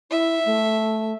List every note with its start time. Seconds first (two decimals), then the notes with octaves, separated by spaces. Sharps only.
0.11 E4 E5
0.45 A3